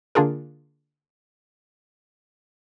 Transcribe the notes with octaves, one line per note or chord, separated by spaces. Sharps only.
D3 A#3 D4 F4 G#4 A#4